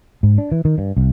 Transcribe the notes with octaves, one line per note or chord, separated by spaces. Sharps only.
G#2
D4
E3
D#3
G2
C2